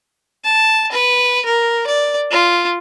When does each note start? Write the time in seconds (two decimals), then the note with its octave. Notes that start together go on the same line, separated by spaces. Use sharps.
0.45 A5
0.92 B4
1.45 A#4
1.87 D5
2.31 F4